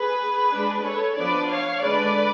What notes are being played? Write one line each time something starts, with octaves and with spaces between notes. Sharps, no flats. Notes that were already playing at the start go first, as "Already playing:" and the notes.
Already playing: G#4 B4
G#3 D4
A4 C#5
F3 B3 D4 B4 D5
C#5 F5
D3 G#3 D4 B4 D5